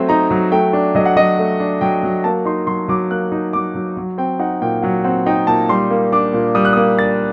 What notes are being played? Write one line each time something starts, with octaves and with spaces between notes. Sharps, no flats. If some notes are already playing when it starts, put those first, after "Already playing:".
Already playing: F#3 A3 C4
D#4 A#5
F#3
A3 G5
D4
F#3 D#5
F#5
F#3 D#5
A3
D4
F#3 G5
F#3
A#3 A5
D#4 C6
F#3 C6
F#3 D6
A#3 F#6
D#4
F#3 D6
F#3
F#3
C4 G5
D#4 F#5
A#2 G5
F#3 F#5
C4 F#5
D#4 G5
A#2 A5
G3 C6
A#3
D4 D6
A#2
G3 D#6
F#6
D#6
A#3
D4 A6